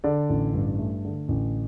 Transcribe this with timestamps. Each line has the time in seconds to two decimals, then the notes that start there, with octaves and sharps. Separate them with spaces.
0.04 D3 D5
0.29 A1
0.54 G2
0.79 A3
1.05 D3
1.28 A1